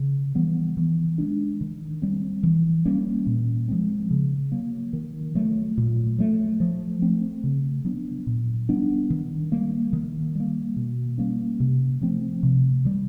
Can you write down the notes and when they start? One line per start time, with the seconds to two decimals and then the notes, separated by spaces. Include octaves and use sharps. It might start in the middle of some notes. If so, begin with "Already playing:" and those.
Already playing: C#3
0.35 E3 G3 B3
0.77 E3
1.18 G#3 B3 D4
1.61 D#3
2.02 G3 C4
2.43 E3
2.85 G3 A#3 C#4
3.27 A#2
3.68 F3 G#3 C4
4.11 C#3
4.52 F#3 A#3
4.93 D#3
5.35 F#3 A3
5.78 A#2
6.18 F#3 A3
6.60 F3
7.02 A3 C4
7.44 C#3
7.85 F#3 B3 D4
8.27 A#2
8.69 G3 B3 D4
9.10 D#3
9.52 G3 A#3
9.93 D#3
10.35 G3 A#3
10.76 B2
11.18 G3 A#3 C#4
11.60 C3
12.01 F3 A3 C4
12.43 C3
12.85 D#3 G3